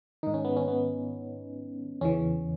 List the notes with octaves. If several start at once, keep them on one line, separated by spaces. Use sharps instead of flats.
G#2 D#3 D#4
C#4
B3
C#4
B3
E2 C#3 E3 C#4